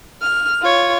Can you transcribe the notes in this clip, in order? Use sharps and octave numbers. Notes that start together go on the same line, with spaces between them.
F6
F4 C#5